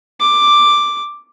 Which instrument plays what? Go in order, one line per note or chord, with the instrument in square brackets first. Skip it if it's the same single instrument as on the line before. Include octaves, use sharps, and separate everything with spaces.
[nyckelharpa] D6